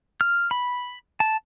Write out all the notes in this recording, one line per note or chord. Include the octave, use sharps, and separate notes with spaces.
F6
B5
A5